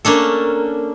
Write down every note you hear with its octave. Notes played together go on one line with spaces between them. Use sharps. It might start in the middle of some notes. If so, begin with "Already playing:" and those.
A#3 C#4 D4 A4